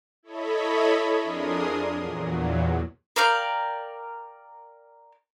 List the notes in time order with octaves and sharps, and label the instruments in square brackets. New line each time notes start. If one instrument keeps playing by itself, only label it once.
[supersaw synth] E4 A4 C#5 D#5 B5
F2 D4 G#4 A#4 C6 D#6
E2 A#2 F#3
[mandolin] A#4 D5 F5 G5